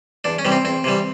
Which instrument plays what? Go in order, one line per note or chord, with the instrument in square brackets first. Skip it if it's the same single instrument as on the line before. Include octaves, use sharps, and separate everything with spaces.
[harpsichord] E2 D4
C#4
C3 E3 G3
C4
E2 C4
C3 E3 G3